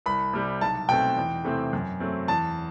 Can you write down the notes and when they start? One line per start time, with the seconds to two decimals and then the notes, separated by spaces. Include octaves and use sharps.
0.06 C2 B5
0.33 C3 G3
0.61 B1 A5
0.88 B2 A3 C4 G5
1.17 E2
1.44 C3 E3 A3 C4
1.73 F#2
2.00 F#3 A3 C4
2.28 E2 A5